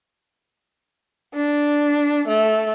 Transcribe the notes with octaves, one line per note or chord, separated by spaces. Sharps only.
D4
A3